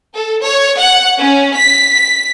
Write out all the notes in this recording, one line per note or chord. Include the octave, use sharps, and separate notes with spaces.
A4
C#5
F#5
C#4
B6
B6